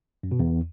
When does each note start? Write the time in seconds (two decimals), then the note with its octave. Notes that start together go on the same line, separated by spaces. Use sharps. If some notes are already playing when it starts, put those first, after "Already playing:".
0.23 F#2
0.31 B2
0.39 E2